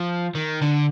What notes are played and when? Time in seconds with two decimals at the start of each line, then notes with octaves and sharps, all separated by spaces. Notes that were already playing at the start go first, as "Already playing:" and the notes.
Already playing: F3
0.35 D#3
0.62 D3